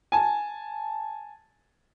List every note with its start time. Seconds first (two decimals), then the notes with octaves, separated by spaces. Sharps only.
0.12 G#5 A5